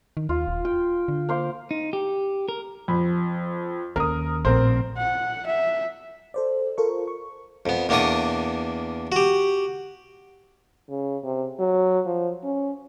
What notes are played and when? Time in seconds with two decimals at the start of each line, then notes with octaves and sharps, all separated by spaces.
0.17 D#3
0.29 D#2 F4
0.48 D#1
0.65 F4 G5
1.08 D3
1.29 A#3 C5 F5
1.71 D#4
1.93 G4
2.49 A#4
2.88 F2 B5
3.96 D#2 C#4 A#4 D#6
4.45 A#1 A2 C4 A#4 C5
4.98 F#5
5.47 E5
6.34 A4 C5 D5
6.78 F4 A4 A#4 C5 C#6
7.08 C#6
7.66 F2 B3
7.89 E2 A#3 B3 D4 C#6 D#6
9.12 F#4 G4
10.89 C#3
11.24 C3
11.60 F#3
12.06 F3
12.44 C#4